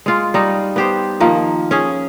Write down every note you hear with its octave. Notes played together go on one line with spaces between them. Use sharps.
G#3 F4
G3 D#4
B3 G4 C5
D#3 F3 A#3
C#4 G#4